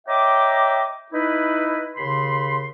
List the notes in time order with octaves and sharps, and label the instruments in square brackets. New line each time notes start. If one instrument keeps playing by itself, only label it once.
[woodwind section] C#5 D#5 E5 G5 A#5 D6
D#4 E4 B4
D#2 C#3 B5 C6